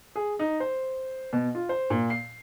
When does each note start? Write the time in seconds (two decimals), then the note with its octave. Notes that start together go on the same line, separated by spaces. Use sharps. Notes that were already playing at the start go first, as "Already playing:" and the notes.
0.16 G#4
0.39 D#4
0.60 C5
1.33 B2
1.55 F4
1.69 C5
1.90 A#2
2.10 C7